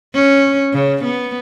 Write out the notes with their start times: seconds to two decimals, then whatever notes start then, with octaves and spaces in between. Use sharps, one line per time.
0.15 C#4
0.73 C#3
1.04 B3